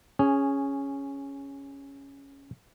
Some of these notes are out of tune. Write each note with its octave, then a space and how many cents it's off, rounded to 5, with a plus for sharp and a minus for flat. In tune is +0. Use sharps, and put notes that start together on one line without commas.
C#4 +0 G#4 -10